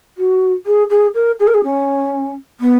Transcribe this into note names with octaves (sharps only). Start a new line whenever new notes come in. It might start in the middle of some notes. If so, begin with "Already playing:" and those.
F#4
G#4
G#4
A#4
G#4
A#4
G#4
C#4
B3